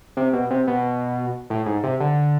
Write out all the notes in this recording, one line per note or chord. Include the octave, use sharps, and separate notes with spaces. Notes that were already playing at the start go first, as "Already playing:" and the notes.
C3
B2
C3
B2
A2
G#2
C3
D3